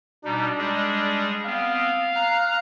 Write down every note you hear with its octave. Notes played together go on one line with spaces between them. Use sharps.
B2 G3 D4 D#4
G3 G#3 G#4
B3 C4 F5
A#5 F#6